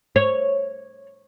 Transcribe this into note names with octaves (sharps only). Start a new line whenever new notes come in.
C#5